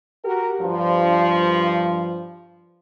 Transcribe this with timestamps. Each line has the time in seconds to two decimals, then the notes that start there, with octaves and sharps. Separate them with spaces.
0.25 F#4 G4 A#4
0.61 G2 F3